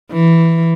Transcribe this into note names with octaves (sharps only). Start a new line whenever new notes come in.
E3